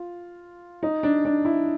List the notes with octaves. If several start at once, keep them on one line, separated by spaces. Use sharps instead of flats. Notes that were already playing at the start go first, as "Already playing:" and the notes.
Already playing: F4
D#4
D4
D4
E4